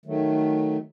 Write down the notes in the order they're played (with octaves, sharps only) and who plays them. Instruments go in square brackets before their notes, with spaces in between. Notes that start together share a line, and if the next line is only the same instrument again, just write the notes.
[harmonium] D#3 F#3 A3